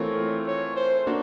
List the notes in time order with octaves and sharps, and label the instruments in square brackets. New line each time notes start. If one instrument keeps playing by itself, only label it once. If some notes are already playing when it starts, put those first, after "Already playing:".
Already playing: [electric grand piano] E3 A3 C4 F4 A#4 [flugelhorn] C#5
[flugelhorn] C#5
C5
[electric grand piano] A#3 D4 F#4